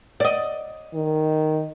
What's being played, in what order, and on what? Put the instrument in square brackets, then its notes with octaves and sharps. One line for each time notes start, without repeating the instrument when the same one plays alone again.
[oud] D5 D#5
[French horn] D#3